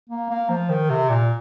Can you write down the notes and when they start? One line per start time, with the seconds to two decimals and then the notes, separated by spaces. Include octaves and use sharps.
0.09 A#3
0.30 A#3
0.49 F3
0.70 D#3
0.90 C3
1.10 A#2